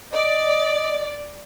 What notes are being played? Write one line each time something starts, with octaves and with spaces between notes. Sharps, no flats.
D5 D#5